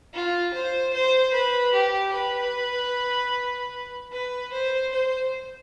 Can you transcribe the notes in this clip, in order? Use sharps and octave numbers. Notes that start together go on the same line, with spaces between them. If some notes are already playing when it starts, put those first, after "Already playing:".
F4
C5
C5
B4
G4
B4
B4
C5
C5